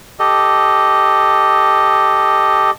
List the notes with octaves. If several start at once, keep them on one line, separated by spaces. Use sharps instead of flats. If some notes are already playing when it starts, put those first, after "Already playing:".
G4 A4 D#5